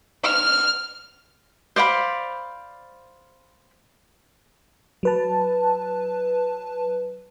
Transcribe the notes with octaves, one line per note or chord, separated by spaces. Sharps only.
F6
C5 D5 F5 B5
F#3 B4 A5